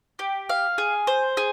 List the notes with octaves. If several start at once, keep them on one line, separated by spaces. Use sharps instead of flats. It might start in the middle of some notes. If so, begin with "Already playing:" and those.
G4
F5
G#4
C5
G#4